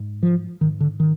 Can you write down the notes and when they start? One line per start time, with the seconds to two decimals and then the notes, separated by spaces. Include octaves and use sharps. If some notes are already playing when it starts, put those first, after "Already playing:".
Already playing: G#2
0.23 F3
0.61 G#2 D#3
0.80 D3
1.00 D#3